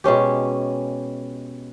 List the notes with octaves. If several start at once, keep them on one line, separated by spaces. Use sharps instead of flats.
B2 G#3 C#4 G4